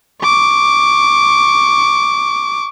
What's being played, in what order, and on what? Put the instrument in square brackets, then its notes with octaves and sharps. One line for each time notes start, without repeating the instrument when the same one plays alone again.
[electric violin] C#6 D6